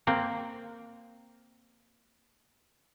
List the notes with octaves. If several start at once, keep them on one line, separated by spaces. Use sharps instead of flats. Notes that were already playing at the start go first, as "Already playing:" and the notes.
A#3 C4